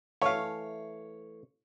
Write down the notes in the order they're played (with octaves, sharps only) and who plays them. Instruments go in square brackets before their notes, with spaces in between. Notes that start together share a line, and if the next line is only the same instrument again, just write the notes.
[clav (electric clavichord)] E3 A3 [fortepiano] C#5 F5